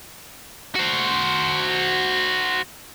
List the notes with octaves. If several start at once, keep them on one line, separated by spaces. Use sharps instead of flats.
F#4 C5